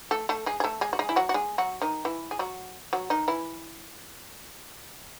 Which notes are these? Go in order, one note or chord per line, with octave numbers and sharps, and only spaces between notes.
A3 A4
A3 A4
G#3 G#4
G#4
A3 A4
G#3 G#4
F#4
G#3 G#4
E4
F#3 F#4
F#4
G#3 G#4
F#3 F#4
D#3 D#4
E3 E4
G#4
F#3 F#4
F#3 F#4
D#3 D#4
E3 E4